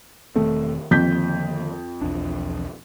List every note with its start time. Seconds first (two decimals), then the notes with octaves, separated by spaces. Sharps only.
0.36 E1 D#3 A3 C4
0.91 F2 D3 D#3 A#3 G6 B6
2.02 B1 E2 D4